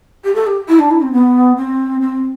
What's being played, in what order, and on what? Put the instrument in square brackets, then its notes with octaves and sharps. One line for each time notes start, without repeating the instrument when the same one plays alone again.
[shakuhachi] G4
A4
G4
E4
D4
E4
C4
B3
C4
C4